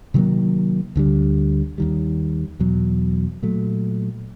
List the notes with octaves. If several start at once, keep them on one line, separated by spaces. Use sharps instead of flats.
C3 D#3 F#3 A#3
D2 D3 G3
D#2 D#3 G3
E2 B2 F#3
A#2 F#3 A3